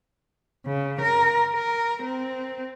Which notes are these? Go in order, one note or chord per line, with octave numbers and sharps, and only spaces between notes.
C#3
A#4
A#4
C4